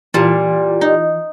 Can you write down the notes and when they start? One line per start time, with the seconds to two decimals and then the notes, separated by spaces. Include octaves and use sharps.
0.14 A#2 E3 G3 F4 A5
0.81 D#4